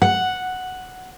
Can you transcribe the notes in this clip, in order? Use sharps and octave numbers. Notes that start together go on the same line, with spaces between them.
F#5